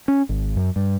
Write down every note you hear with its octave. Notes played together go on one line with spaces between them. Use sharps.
C#4
G#1
F#2
G2